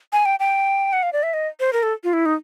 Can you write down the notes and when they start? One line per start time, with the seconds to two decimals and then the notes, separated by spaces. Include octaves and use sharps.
0.13 G#5
0.25 G5
0.40 G5
0.93 F#5
1.03 F5
1.13 D5
1.23 E5
1.34 D#5
1.60 C5
1.73 A#4
1.83 A4
2.04 F4
2.13 E4
2.26 D#4